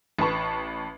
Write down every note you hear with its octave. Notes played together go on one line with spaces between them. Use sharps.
A1 B4 A5 C#6